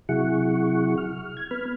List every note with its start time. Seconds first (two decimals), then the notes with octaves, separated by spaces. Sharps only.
0.09 C3 F#3 E4 G#4 F#5 C#6
0.98 F6
1.37 G#6
1.51 B3 B5 F6